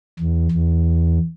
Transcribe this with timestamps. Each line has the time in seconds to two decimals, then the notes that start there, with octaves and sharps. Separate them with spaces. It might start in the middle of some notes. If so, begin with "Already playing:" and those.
0.20 E2
0.52 E2